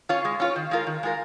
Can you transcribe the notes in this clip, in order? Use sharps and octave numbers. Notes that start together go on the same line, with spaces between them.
C#4 F4 C#5
G#3
C#4 F4 C#5
D#3
G#3 F4 A#4
D#3
G#3 F4 A#4